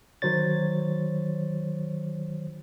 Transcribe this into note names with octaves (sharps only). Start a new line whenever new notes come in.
D#3 F#3 C5 C#5 A6